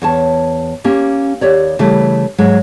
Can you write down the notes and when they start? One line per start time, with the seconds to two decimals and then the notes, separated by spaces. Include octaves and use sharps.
0.02 E2 C#5 A5
0.84 A#3 C#4 G4
1.41 D#2 G4 C#5 D5
1.79 C#3 E3 G3 A3
2.38 G#2 F#3 G#3